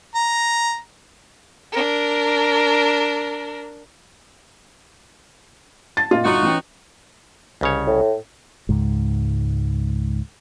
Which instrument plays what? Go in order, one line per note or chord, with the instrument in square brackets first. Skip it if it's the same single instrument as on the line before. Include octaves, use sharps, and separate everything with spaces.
[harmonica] A#5
[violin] D4 A#4
[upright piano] A5 [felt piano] A6
[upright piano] A#2 D#5 [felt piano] F4
[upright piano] G1 F5 C6 [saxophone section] D#4 F#4
[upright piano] E3 C#4 G5
[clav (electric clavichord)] C2 C#3 C#5
[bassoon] A2
[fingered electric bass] C#2 G#2